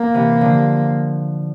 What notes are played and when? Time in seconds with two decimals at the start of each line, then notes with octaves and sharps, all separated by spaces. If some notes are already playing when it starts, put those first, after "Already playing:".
Already playing: A#3
0.14 C3 E3
0.41 D3 F3